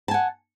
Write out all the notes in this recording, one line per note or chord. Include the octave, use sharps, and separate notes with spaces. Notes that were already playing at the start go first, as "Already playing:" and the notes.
F#5 G#5 A5